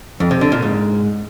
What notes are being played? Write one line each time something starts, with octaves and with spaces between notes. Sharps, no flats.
F2
C3
D3
A#2
G#2